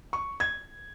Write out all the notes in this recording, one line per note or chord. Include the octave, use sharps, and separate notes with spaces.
C#6
G#6